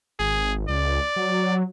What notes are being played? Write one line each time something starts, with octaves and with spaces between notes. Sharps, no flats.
G#1 G#4
C#2 D5
F#3